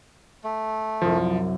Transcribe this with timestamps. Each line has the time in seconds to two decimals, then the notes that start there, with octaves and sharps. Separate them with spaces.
0.44 A3
1.02 C2 F#2 C3 F3